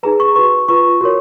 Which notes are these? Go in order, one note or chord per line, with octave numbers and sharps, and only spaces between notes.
D#4 G#4 B4 A#5
C#6
F#4 B4 C#6
F4 B4 C#6
F#4 A#4 C#5